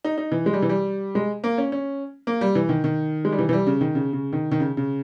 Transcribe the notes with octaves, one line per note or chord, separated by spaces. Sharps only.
D#4
D#4
E3
G#3
G3
E3
G3
G#3
A#3
C#4
C#4
A#3
G3
E3
D#3
D#3
G#3
G3
E3
E3
G3
C#3
D#3
C#3
C#3
D#3
D#3
C#3
C#3